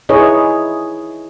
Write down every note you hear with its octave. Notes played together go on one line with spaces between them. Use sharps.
D#4 E4 G#4 B4 C#5 D#5